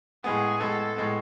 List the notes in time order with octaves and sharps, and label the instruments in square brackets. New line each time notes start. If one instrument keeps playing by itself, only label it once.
[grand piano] A2 G#3 B3 [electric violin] G#4
[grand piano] A2 G#3 B3 [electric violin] A4
[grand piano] A2 G#3 B3